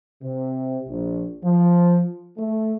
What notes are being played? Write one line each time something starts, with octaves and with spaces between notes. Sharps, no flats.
C3
A#1
F3
A3